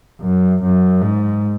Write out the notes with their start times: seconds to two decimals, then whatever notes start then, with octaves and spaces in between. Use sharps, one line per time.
0.21 F#2
0.62 F#2
1.01 G#2